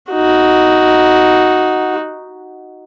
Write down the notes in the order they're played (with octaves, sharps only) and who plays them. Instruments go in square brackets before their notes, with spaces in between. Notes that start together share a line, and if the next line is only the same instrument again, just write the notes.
[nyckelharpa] D#4 F#4